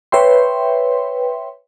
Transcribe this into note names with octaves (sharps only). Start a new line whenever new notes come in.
B4 C#5 E5 G5 C6